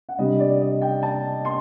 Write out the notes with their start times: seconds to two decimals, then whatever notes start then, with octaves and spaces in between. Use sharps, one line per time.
0.09 F#5
0.18 C3 G3 D4 D#5
0.40 D5
0.61 D#5
0.82 G5
1.03 A5
1.45 C6